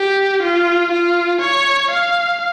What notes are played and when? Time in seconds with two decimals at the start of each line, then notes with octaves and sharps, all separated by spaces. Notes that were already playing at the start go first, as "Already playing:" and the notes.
Already playing: G4
0.43 F4
0.92 F4
1.42 C#5
1.91 F5